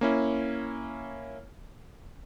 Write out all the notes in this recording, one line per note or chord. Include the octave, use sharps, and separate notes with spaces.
A#3 C#4 E4